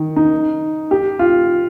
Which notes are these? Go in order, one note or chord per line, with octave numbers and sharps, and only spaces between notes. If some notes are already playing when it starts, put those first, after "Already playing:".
Already playing: D#3
D#4
G4
F4